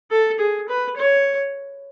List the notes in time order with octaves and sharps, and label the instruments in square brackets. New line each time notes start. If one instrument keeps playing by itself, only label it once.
[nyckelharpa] A4
G#4
B4
C#5